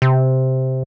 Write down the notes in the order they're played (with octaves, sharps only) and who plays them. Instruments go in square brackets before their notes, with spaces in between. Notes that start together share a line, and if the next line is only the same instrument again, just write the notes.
[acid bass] C3